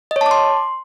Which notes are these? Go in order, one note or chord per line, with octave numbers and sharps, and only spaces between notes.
D#5
C#5
A5
D6
C6